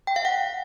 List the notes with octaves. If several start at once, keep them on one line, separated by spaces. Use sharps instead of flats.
G5
F5
F#5